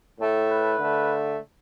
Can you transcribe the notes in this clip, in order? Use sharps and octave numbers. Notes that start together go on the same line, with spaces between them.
A2 A3
B4
D3 A3